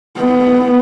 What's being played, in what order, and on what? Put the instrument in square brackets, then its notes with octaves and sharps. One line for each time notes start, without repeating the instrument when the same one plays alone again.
[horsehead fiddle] B3